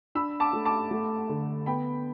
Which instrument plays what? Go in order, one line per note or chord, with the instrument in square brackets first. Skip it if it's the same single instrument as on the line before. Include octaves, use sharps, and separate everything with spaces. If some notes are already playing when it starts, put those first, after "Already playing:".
[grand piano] D4 [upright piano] B5 E6
[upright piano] A5 D6
[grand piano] A3
[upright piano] A5 D6
[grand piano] A3
D3
[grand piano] B3 [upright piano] G5 B5